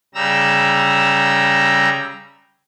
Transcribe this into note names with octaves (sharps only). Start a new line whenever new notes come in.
C#3 G3 A#5 E6